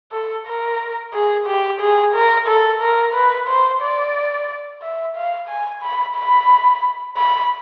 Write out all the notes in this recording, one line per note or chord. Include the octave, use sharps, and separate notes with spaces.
A4
A#4
G#4
G4
G#4
A#4
A4
A#4
B4
C5
D5
E5
F5
G#5
B5
B5
B5